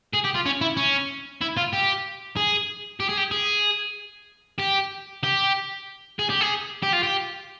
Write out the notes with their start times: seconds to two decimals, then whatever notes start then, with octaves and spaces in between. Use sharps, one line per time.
0.13 G#4
0.24 G4
0.34 F4
0.46 C#4
0.61 E4
0.77 C#4
1.41 E4
1.57 F4
1.73 G4
2.37 G#4
3.00 G4
3.09 G#4
3.18 G4
3.31 G#4
4.60 G4
5.23 G4
6.19 G#4
6.30 G4
6.41 G#4
6.83 G4
6.92 F4
7.03 G4